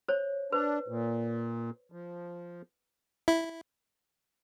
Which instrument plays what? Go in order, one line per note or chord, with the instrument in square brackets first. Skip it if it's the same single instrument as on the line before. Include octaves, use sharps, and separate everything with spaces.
[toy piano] C5 C#5
[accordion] D4 [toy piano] B4 C5
[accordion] A#2
F3
[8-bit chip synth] E4